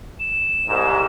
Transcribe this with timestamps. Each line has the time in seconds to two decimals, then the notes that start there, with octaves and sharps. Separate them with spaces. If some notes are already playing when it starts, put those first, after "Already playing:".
0.20 E7
0.67 C2 G#2